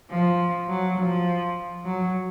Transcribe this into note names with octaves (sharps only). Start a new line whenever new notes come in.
F3
F#3
F3
F#3